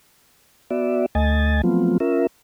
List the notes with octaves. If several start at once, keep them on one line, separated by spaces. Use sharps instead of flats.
B3 F#4 D5 E5
D2 A3 D#5 G#5 A6
F3 F#3 A3 B3 C4 F4
C#4 F4 A#4 E5